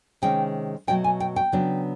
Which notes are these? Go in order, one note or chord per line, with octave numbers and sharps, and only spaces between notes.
C3 D#3 G#3 C#4 G5
B2 F#3 A3 G5
G#5
G5
G5
C#3 F#3 B3 D4